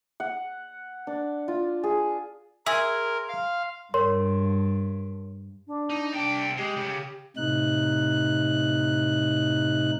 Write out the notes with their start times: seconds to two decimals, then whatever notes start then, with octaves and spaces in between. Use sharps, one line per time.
0.20 F#5
1.07 D4
1.48 F4
1.84 G#4
2.66 G#4 A#4 E5 C6
3.28 F5
3.94 G2 A#4 C#5 C6
5.67 D4
5.90 D#4
6.13 C2 D4 G5
6.57 G#3 G4
6.76 C#3
7.37 A2 C3 D#4 F#6